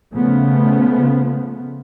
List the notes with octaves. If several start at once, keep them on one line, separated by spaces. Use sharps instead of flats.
C#3 F3 A3 B3